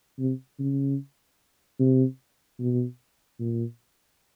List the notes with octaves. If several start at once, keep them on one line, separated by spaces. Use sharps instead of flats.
C3
C#3
C3
B2
A#2